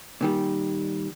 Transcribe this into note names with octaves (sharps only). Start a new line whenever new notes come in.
A#2 D#3 G3